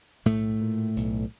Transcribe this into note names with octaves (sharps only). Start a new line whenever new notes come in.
B1 A2 A3
A#2
B1